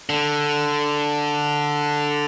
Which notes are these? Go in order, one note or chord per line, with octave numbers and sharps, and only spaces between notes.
D3